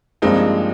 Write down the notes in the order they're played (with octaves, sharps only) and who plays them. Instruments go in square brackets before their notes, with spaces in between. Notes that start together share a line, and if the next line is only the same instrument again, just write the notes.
[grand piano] G2 F3 A#3 D#4 [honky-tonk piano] G#3 C4